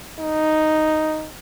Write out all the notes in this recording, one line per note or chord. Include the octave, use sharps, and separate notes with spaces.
D#4